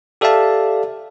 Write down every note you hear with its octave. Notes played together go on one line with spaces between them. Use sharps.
G4 A4 D5 E5 F5 A5